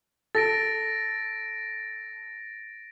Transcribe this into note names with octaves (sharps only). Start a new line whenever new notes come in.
A4 A6 A#6 D7